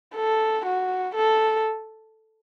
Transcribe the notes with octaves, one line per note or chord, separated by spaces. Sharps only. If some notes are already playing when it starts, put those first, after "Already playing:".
A4
F#4
A4